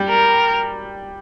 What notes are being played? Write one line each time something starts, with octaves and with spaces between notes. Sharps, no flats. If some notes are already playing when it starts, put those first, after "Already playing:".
Already playing: G3
A#4